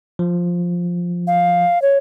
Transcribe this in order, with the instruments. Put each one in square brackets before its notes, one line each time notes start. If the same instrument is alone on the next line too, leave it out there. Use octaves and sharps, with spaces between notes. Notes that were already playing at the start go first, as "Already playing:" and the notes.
[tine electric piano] F3
[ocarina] F5
C#5